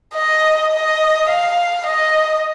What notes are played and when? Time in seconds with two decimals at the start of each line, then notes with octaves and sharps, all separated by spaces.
0.14 D#5
0.72 D#5
1.30 F5
1.87 D#5